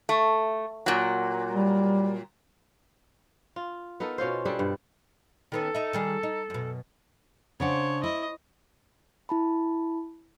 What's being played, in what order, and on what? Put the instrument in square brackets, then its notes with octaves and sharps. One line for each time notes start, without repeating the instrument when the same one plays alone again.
[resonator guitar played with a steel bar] A3
A#2 F#3
[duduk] G3
[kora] F4
B3 D#4 A4 A#4
B2 C#4 F4 C5
G3 D4 G#4 A4
G2
[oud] D#3 B3 C#4 [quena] A4
[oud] D#4 E5
D#3 G3 G#4
D#4
F#2 B2
[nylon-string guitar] C#3 D4 F#5 [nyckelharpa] C5 C#5
[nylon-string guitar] E4 [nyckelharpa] D#5
[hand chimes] E4 A5 B5